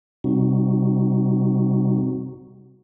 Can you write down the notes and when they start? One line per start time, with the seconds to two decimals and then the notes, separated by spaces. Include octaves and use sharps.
0.24 C3 G3 C4 D#4 F#4